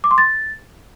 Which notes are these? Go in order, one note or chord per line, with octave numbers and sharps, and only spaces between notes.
D6
C6
A6